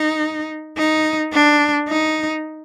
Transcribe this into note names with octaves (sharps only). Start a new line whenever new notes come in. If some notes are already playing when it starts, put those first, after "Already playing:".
Already playing: D#4
D#4
D4
D#4